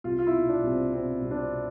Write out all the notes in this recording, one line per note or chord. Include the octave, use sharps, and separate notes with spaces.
C2 F4
F4
E4
B2
D4
C2
C4
B2 C4
C2
D4
C4
B2